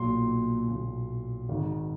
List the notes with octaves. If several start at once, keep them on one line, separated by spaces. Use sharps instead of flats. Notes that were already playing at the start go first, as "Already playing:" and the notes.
Already playing: B1 A#2 C6
B1 A#2
G#1 G#2 D#3